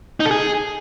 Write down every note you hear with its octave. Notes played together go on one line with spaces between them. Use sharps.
D#4
A4
G#4